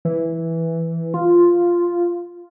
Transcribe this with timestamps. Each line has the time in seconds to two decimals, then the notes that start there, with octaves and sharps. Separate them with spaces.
0.05 E3
1.14 F4